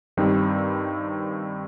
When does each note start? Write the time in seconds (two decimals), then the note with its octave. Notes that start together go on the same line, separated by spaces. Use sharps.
0.17 G2 D#3 G3 C4 D#4